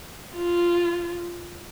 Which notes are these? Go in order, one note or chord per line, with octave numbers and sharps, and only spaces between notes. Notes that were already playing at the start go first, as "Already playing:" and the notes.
F4